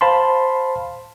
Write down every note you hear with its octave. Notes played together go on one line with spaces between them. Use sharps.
C5 F5 A5 B5 C6